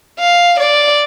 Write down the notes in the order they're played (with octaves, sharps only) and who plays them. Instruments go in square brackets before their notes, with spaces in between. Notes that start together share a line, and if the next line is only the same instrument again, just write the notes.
[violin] F5
D5